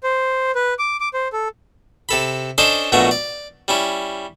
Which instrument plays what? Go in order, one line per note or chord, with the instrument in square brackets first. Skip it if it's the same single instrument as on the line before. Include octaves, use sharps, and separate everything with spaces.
[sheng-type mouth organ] C5
B4
D6
D6
C5
A4
[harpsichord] C3 A4 B5
C#4 D4 A4 C5 D#5
A#1 B2 F#3 A3 C#4 A#5
D5
G3 C#4 E4